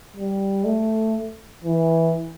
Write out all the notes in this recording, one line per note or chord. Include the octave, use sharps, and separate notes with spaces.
G3
A3
E3